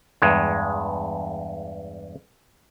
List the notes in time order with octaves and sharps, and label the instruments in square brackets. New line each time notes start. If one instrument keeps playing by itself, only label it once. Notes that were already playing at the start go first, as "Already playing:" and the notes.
[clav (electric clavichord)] E2 G2 G#3